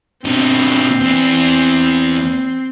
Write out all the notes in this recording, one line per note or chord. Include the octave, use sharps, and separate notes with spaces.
B2 D3 C4
E2